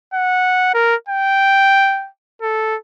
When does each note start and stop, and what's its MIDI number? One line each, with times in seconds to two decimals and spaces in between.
0.14 0.71 78
0.74 0.95 70
1.09 2.08 79
2.42 2.76 69